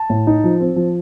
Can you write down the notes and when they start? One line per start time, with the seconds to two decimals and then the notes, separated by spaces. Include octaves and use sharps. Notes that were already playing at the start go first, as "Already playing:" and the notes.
Already playing: A5
0.10 A2
0.27 D#4
0.44 F3
0.60 C4
0.76 F3